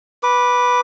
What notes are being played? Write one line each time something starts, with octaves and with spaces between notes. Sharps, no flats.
B4 D6